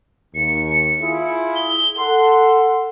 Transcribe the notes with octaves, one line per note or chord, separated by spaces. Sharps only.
D#2 C#7
E4 F4 G#4
G7
A4 F#5 C6